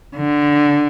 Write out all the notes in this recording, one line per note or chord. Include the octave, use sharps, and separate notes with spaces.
D3